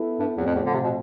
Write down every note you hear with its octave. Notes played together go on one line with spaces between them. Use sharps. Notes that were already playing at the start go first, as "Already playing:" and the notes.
Already playing: B3 E4 A4
G2
E2 A2 F3 C4
F2
E2
D3
C3
B2